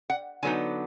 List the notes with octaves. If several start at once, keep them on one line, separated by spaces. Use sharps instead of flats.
F#5
D3 F#3 B3 D#4 G#5